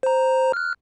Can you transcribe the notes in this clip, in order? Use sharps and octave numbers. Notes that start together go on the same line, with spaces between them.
C5 A#5
F6 F#6